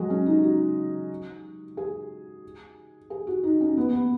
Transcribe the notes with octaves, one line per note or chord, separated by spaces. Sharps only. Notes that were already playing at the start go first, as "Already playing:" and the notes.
Already playing: F#3 G#3
C#4
D#4
F#4
G#4
G#4
F#4
D#4
C#4
B3
B3